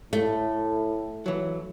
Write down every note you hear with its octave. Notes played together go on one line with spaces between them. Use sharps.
A2 A3
E3 F#3